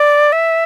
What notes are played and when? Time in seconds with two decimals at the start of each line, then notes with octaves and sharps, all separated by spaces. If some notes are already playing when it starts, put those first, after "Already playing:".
Already playing: D5
0.32 E5